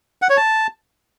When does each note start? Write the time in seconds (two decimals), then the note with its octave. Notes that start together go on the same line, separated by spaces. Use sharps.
0.22 F#5
0.30 C#5
0.37 A5